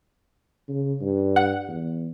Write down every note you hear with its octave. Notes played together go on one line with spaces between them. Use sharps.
C#3
G2
F#5
E2